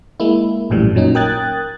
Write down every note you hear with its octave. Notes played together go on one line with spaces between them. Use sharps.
G#3 A#3 E4
A#1 F#2 A2 E3 G3
A#2 F#3 C#4 D#4
A#4 G5 D#6 F#6 G#6 A6